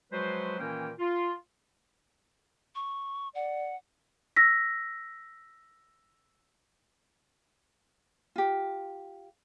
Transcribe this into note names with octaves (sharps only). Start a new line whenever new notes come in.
F3 F#3 G#3 F#4 B4 C5
A#2 D#3 E3 A#3 C#4 G5
F4
C#6
D5 F#5
E6 A#6 B6
F4 G4